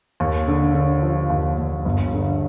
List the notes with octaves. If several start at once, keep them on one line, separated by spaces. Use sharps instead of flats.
D#2
D3
D3
F3
D#2
D#2
G1
D3